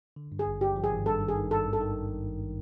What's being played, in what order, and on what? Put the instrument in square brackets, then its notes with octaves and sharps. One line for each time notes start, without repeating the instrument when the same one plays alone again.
[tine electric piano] D3
G2
[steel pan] G#4
[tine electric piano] G#1
[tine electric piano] G2 [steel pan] G4
[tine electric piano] F3
[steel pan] G#4
[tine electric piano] G#1
[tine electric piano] G2 [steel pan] A4
[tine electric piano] D#3
[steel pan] G#4
[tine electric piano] D#3
[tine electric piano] G3 [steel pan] A4
[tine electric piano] G#1
[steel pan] A4
[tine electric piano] D#3